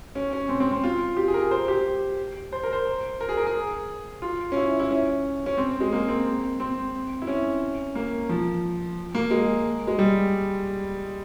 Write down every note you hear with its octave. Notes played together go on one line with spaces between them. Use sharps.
C#4
C#4
C4
C4
C4
F4
G4
G#4
A#4
C5
G4
C5
A#4
C5
A#4
G#4
A#4
G#4
F4
C#4
E4
E4
C#4
C#4
C4
G#3
A#3
C4
C4
E4
C#4
A#3
F3
A#3
G#3
G#3
G3